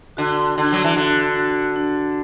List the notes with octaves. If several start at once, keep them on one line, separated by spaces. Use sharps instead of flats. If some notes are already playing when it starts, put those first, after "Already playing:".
D3 F#4
D3 D4
F#3
E3
D3 F#4
F#4
D4